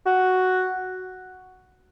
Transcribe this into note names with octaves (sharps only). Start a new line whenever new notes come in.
F#4